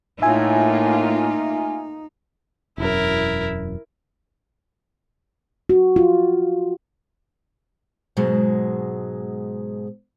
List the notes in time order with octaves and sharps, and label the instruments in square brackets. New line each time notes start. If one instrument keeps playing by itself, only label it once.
[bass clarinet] A2 [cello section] A3 A#3 F4 [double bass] D#4 [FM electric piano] E5 G#5
[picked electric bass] E1 F#2 [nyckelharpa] E4 A#4
[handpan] F#4
F4
[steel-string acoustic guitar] G#2 B2 F#3 G#3